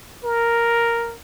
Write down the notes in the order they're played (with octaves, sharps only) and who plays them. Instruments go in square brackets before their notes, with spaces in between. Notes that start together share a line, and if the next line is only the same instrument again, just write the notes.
[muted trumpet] A#4